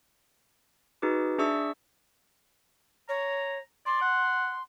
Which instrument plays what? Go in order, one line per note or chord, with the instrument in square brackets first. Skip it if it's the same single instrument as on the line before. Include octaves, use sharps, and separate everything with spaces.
[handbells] D#4 F#4 G#4 B4 D6
D4 G#4 D5 E5 C#6 E6
[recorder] C#5 [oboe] A#5
[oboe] D5 [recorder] C6
[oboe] F#5